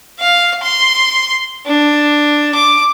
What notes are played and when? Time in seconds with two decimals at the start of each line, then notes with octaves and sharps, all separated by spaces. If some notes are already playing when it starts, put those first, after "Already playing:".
0.20 F5
0.63 C6
1.66 D4
2.55 D6